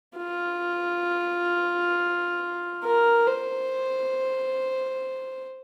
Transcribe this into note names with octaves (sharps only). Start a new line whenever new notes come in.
F4
A#4
C5